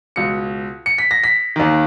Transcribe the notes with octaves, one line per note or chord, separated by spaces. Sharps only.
C#2 B2 C#7
C#7
B6
A#6
B6
D#2 D#3